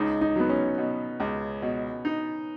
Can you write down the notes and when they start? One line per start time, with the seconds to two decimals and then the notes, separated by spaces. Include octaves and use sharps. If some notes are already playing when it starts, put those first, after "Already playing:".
Already playing: C#2 D#4
0.21 D#4
0.36 F#3 B3
0.49 C#4
0.78 B2
1.20 C#2
1.62 B2
2.05 D#4